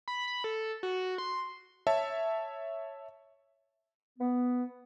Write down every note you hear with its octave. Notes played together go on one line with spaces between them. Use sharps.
B5
B5
A4
F#4
C6
C#5 E5 A5
B3